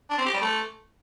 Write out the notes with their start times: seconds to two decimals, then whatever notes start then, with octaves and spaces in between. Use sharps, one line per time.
0.10 D4
0.18 C4
0.26 G4
0.34 G3
0.42 A3